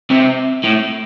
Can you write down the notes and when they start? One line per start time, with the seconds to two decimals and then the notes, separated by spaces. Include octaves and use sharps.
0.10 C3
0.64 A2